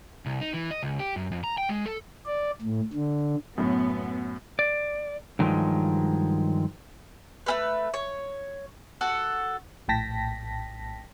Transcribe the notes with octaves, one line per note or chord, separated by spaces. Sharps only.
C2
D#4
E3
D#5
C#2
G4
F#2
F2
A#5
G5
G#3
A4
D5
A2
D3
F#2 A2 B3
D5
G2 D#3 F3 F#3 G#3
A3 C#4 B4
C#5
F#4 A4 F#5
A#1 A2 G5 A5 A#6 B6